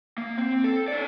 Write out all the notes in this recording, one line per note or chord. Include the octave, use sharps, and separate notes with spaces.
A#3
C4
A4
C#4 D5